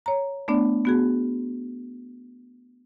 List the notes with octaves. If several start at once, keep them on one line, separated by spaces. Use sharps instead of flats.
C#5 A#5
A3 B3 D4 D5
B3 F#4 G#4